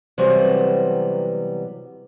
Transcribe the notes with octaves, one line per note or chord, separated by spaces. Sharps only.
C3 E3 F#3 G3 B3